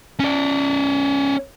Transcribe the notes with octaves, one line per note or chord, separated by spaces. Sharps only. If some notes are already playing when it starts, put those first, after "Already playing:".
C#4 D5